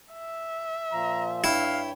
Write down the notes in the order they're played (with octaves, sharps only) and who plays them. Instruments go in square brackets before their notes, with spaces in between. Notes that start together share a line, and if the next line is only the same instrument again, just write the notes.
[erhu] E5
[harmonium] A#2 F3 [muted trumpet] A#5
[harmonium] G2 C#5 G5 [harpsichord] E4 [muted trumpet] F5